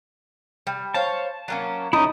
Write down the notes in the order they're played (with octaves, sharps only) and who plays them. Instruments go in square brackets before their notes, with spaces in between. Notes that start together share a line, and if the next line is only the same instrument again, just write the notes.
[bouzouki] G3
[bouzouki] C5 C#5 F5 [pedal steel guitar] A5
[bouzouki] F#3 A#3 C#4
[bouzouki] A3 [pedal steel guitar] C#4 E4 [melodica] D#4 D#6